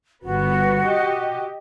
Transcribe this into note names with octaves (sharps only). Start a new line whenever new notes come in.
G1 B3 F#4
G4 D#5